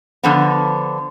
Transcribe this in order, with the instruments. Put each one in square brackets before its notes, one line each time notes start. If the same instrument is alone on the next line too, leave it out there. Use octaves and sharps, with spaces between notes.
[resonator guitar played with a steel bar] D3 F3 B3